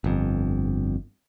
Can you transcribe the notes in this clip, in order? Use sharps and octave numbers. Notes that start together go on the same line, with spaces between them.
G1 F2